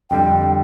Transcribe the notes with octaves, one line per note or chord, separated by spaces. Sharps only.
F2 D3 G3 G5